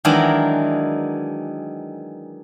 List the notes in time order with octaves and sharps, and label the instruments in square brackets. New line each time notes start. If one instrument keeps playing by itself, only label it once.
[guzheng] D#3 E3 F#3 G#3 D4 A#4